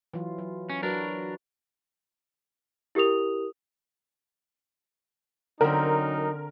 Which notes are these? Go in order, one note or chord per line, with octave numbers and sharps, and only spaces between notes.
E3 F#3 F4
F#3
C#4
F#3 D4 F#4 A#4 B4
E4 G4 A#4 D#6 F7
D3 F#3 C4 C#4 D#4 A#4